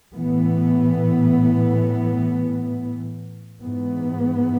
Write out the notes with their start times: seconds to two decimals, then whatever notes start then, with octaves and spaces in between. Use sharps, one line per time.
0.14 A2 E3 B3
3.63 G#2 E3 B3